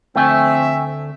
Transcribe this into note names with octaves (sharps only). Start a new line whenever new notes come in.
D2 F3 A3 C4 E5 G5 G#5 C#6